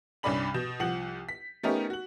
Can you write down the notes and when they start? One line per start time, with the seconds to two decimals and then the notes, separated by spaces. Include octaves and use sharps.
0.23 C2 G2 C#4 D5 B5 F#7
0.54 B2 G6 E7
0.80 C2 F3 F#5 F#7
1.29 B6
1.63 A3 B3 C#4 D#4 G4 A#4
1.90 F#4 F#7